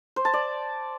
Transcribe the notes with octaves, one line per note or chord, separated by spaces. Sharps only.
C5
A5
D5